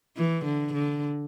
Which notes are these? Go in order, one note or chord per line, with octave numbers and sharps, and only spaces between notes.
E3
D3
D3